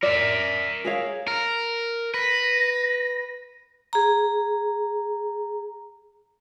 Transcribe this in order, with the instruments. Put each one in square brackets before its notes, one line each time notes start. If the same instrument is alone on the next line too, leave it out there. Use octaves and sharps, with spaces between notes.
[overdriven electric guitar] A#4 E5 [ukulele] D5
[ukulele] G#4 C#5 F5
[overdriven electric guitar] A#4
[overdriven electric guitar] B4 [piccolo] A#6
[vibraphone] G#4 A#5